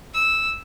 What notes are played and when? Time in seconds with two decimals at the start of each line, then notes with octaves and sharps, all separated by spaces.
0.14 E6